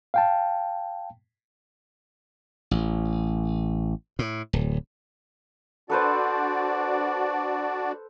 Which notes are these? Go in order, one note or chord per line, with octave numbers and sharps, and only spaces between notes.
F5 G5 A5
A1
A2
D1
D4 F#4 A4 B4 C5 D5